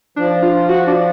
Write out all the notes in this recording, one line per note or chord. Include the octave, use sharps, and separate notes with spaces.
F3 D4
F4
F#4
D4